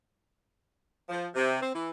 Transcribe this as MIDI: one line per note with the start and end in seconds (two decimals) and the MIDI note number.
1.09 1.27 53
1.34 1.56 48
1.60 1.71 60
1.73 1.90 52